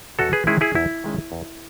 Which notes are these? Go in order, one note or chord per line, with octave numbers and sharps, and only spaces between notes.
E2 F#4 A4
G#4 B4
D#3 G#3 C#4 E4 G#4
E4 G#4
E2 E4
D#3 G#3 C#4
E2